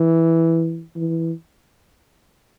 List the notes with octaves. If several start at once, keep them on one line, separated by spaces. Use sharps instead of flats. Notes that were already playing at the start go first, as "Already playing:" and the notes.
Already playing: E3
E3